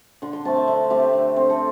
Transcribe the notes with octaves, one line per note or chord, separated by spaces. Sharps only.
D3 C6
C6
A3 C4 A5
E5
D3 E5
A3 C4 G4
D3
C4
A4